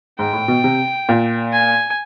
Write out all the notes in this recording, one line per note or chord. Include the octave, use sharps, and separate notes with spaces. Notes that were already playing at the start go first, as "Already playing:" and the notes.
G#2 G5
A2
B2
C3
A#2
G#5